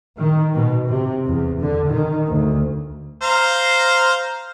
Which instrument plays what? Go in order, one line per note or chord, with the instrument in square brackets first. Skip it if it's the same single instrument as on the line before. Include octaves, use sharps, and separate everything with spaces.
[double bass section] D#3
B2
C3
E2
D3
D#3
D2
[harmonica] C5 F5 A#5